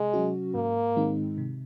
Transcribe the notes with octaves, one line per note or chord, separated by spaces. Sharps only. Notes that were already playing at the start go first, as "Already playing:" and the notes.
Already playing: C3 G#3
F#3 C#4 F#4
G#2 A#3
D#3 G#3 C4 D#4
C3